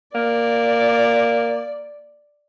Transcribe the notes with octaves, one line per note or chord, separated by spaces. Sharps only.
A#3 D5